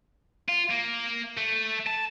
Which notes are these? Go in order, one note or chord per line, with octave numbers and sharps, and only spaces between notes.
F4
A#3
A3
A5